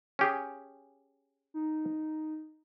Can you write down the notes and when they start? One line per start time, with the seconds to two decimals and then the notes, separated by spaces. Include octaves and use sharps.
0.19 C#4 G4 G#4
1.54 D#4